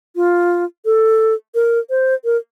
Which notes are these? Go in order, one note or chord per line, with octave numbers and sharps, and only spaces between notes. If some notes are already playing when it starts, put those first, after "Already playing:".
F4
A4
A#4
C5
A#4